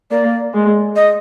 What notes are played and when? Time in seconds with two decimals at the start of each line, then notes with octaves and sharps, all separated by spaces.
0.11 A#3 D5
0.53 G#3
0.96 D#5